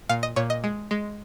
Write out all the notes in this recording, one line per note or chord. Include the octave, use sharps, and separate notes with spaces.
A#2 F5
D#5
A#2 C#5
D#5
G#3
G#3